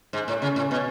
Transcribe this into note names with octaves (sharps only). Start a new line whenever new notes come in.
G#2
A2
C#3
A2
B2